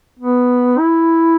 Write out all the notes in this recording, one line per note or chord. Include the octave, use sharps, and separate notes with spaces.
B3
E4